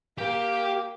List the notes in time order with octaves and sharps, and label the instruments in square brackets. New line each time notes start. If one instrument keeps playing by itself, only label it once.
[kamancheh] A#3 [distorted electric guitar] G4 G5